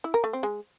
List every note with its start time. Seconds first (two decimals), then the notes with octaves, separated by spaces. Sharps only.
0.04 E4
0.14 A#4
0.24 A3
0.33 C4
0.43 G#3